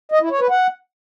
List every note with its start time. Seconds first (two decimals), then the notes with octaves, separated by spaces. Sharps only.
0.12 D#5
0.21 E4
0.31 C#5
0.40 B4
0.50 F#5